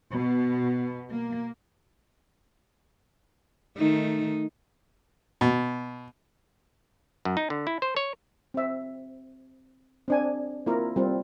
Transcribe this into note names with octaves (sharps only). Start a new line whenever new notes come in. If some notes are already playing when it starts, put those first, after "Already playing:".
B2
A#3
D#3 A3 D#4
B2
F#2
D#4
D3
E4
C5
C#5
C4 E5
C4 D4 G#5
A#3 C4 E4 F4 A#4
G3 C4 F4